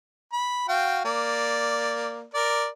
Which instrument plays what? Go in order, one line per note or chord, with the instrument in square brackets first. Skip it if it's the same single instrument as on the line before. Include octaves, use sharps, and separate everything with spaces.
[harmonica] B5
F#4 F5 G5
A#3 D5
A#4 D5